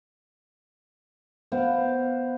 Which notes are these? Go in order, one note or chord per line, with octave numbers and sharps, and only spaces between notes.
B3 C5 F5 D6